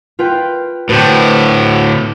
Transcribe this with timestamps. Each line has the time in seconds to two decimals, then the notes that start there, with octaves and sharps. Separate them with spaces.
0.19 F4 B4 G5
0.89 A2 D3 F#4 B4 C5 G5